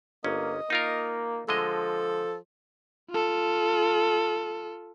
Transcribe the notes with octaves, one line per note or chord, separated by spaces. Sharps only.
G1 A#3 C#4 D#5
A#3 D#4 F4 A#4
D3 F3 G#3 A4 D#5
F4 A4